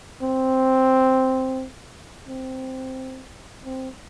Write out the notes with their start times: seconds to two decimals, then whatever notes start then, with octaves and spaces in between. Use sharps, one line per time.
0.22 C4
2.28 C4
3.65 C4